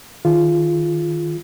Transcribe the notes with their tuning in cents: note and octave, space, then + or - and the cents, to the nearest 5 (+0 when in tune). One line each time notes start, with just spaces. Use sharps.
D#3 +0 F4 -15 G#4 +15